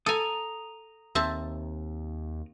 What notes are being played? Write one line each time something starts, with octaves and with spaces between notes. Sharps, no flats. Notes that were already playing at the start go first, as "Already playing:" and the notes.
A4 G#5 A#5 D#6
D#2 C4 E5 A5